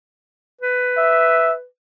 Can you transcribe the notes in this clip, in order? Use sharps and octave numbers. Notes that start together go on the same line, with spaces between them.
B4
E5